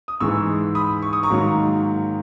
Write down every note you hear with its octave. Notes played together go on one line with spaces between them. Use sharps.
D#6
G#2 E3 G#3 C#6 E6
B5 D#6
C#6
D#6
A#5 C#6
G#2 D#3 F#3 A#3